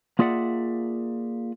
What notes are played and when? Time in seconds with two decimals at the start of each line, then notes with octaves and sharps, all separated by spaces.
0.19 A#3 F4 G#4 D5 E5 F#5